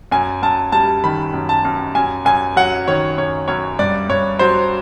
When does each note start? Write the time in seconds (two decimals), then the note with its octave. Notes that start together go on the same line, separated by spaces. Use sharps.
0.12 F#2 G#5
0.43 F#2 A5
0.72 G3 A5
1.04 D#3 B5
1.34 F#2
1.49 A5
1.65 F#2
1.95 F#2 G#5
2.25 F#2 G#5
2.56 F#3 F#5
2.88 D#3 C#5
3.18 F#2 C#5
3.48 F#2 C#5
3.79 G2 D5
4.09 G2 C#5
4.39 F#3 C5